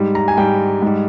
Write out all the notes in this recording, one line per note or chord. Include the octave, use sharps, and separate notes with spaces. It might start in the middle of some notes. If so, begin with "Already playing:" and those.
Already playing: G#2 G3
A#5
G#5
G#2 G3 G5
G#2 G3